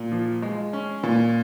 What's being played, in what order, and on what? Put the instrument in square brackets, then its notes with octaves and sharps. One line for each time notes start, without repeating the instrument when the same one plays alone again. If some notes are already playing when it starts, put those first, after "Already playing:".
Already playing: [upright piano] A#2
F3
G#3
C#4
A#2